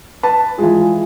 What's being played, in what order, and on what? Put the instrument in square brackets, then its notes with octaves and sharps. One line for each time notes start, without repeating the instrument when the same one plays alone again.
[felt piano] B4 A5
[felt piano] E3 G#3 [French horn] F4